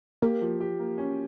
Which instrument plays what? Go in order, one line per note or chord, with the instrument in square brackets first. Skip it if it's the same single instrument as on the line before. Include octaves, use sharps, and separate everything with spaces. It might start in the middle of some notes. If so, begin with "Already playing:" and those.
[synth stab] A#3 [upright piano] G4
[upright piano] F3
G4
A#3
C#4